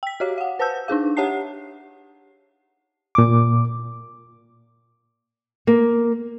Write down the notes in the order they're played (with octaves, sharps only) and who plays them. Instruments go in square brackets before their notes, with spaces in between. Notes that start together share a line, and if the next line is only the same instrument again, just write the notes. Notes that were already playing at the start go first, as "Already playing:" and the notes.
[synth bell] G5 B6
F#4 G4 C#5 F5
F5 F#5
B4 C5 F#5 A5 E6 G6
D4 D#4 G#4 F5
G4 C#5 F#5 A5 C7
[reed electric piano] A#2 D6
[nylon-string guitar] A#3